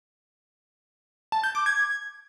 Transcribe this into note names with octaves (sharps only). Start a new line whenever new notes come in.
A5
G6
D6
G#6